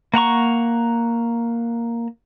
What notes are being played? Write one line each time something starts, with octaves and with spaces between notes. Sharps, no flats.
A#3 F#5 A#5 C#6